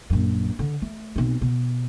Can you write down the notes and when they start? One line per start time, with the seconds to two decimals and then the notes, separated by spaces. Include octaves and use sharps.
0.10 A#1 F#2
0.59 D3
0.82 A3
1.16 B1 C4
1.42 B2